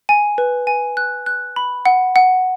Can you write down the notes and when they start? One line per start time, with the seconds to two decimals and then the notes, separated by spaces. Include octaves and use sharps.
0.09 G#5
0.38 B4
0.67 G#5
0.97 F#6
1.26 F#6
1.56 B5
1.86 F#5
2.16 F#5